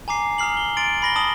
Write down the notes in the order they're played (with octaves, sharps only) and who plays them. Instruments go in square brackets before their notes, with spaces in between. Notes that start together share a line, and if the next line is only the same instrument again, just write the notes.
[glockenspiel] G#5 A#5 D6 C7
A#5 D#6 F6 C7 F#7
G7
C6 A6 D7 F#7
B5 A#6 G7
A5 D#6 F#7 G7